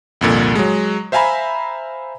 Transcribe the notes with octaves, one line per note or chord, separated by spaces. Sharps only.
C2 F2 A#2 D3
F#3 G#3
C5 E5 F5 G#5 A#5 B5